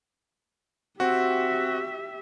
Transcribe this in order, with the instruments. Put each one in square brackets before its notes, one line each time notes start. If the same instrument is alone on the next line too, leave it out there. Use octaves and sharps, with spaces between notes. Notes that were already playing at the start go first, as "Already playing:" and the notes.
[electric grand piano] C4 F#4 [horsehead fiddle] G4 E5